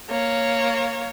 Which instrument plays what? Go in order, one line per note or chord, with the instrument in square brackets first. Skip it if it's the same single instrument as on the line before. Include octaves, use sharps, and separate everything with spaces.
[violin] A#3 C#5